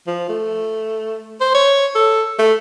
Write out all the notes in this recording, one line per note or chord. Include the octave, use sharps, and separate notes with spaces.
F3
A3
C5
C#5
A4
A3